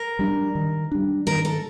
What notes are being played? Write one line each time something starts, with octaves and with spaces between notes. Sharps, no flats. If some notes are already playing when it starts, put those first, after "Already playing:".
Already playing: A#4
G3 D4
D#3
G3 D4
D#3 A#4
A4